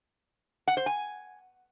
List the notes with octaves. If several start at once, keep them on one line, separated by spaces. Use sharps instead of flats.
F#5
C5
G#5